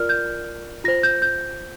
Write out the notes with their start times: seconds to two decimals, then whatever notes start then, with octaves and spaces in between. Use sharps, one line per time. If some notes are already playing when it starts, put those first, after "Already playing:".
Already playing: F4 A#4 D5 F6
0.09 G6
0.84 F4 A#6
0.88 C5
1.03 G6
1.22 G6